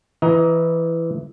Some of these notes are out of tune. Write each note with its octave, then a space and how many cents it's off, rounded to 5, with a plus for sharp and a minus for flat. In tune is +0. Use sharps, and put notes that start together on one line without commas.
E3 +10 D#5 +30 A#5 +20